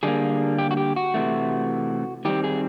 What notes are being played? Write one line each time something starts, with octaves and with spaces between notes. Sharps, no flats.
D3 G3 A#3 G#4
G4
F#4
G4
F#4
C3 E3 A3
D#3 G3 C4 G4
G#4